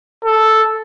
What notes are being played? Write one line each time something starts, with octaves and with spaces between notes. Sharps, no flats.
A4